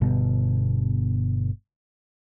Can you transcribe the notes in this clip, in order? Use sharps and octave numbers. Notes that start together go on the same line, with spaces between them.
G1 B2